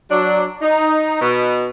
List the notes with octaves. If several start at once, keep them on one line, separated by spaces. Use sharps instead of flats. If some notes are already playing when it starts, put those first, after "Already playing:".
F#3 D4
D#4
B2